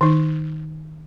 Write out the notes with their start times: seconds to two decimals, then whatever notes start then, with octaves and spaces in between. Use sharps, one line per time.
0.01 D#3 D#4